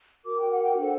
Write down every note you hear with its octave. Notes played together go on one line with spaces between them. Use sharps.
F#4 A#4 D6
G5
F#5
G5
D4 A4 C5 F#5